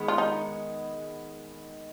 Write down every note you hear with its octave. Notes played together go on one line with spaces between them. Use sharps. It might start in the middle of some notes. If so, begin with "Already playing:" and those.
Already playing: D#3 G#3 B3
F4
D#4